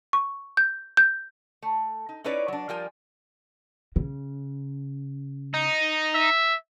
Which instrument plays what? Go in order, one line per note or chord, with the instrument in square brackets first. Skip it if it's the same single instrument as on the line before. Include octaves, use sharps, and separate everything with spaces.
[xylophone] C#6
G6
G6
[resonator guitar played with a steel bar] A3
D#4
C#4 D#4 E4 B4 C#5 D5
F#3 D4
F3 G3 F4 A#4 G#5
[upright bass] C#3
[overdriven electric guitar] D#4
[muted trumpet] E5